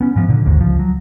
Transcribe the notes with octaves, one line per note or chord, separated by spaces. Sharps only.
B3 C#4
G#2 F3
A#2 D3
G#1 D#2 G#2
C#2 F3
F#3